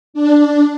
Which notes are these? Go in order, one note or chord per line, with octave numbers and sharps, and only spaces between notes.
D4